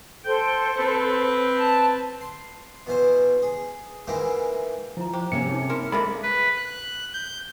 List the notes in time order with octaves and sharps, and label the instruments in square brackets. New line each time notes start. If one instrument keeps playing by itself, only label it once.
[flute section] A4 C5 [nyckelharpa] G5
[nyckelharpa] C4 B4
[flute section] A5
[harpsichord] C6
B2 E3 C5
G#4
G#2 E3 A#3 E4 G5
[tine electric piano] F3 [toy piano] E4 A#5
[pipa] G4 [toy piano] C5
[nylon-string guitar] C3 A#3 C#4 [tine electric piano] C#7
[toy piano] D#4 G#4 C#5
[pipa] E4 A#4 [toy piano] C6
[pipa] C3 F3 A#3 [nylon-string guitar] G#3 [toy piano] A4 E5 [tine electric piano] B5
[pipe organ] B4
F#6
G6